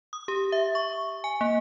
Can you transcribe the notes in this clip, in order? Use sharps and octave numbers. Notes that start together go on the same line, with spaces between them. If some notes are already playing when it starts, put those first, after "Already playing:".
D#6
G4
E5
C#6
G#5
A#3